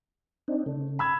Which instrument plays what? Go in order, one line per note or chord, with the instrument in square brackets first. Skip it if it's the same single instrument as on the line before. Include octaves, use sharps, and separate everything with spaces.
[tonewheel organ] C4 D4 D#4
[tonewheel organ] C#3 [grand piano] A3
[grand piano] B5 E6 G#6